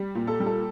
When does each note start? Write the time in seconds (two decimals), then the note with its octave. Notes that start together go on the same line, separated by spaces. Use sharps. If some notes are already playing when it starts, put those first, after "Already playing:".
Already playing: G3
0.15 A#2
0.27 A4
0.40 G3
0.46 A4